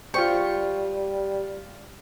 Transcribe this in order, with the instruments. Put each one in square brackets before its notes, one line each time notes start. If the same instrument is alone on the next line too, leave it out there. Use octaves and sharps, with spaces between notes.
[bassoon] G3 [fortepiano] F4 G4 C5 [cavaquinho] C#6